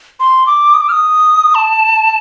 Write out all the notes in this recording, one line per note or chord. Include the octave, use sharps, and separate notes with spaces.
C6
D6
D#6
D6
F6
D#6
A5